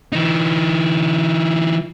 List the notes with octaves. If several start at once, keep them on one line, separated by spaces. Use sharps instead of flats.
E3 D#4